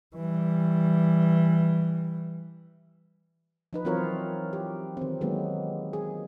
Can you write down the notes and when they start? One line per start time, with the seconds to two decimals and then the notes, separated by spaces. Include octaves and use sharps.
0.16 E3 G3
3.73 F3 D#4 B4
3.85 E3 F#3 C4 F4 A#4 C#5
4.53 G4
4.97 D#3 C4
5.21 D#3 F#3 G#3 A#3 B3
5.93 G#4